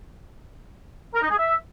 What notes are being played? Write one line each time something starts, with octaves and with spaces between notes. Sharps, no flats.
A#4
D#4
G#4
E5